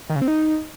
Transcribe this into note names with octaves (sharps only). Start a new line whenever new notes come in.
D#3
C#3
C4
D#4